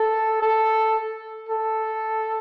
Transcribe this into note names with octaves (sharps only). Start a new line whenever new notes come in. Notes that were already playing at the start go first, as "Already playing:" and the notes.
Already playing: A4
A4
A4